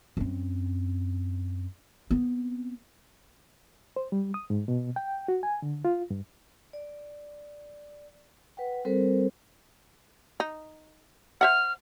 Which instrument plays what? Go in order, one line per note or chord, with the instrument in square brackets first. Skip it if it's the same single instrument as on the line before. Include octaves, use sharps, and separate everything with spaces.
[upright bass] F#2 C4
B3 C4
[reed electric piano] C5
G3
D#6
G#2
B2
G5
F#4
G#5
D3
F4
G2
[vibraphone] D5
B4 F#5 G5
G3 C4 A4 A#4 C5
[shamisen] D#4
[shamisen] C5 E5 F#5 [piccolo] F6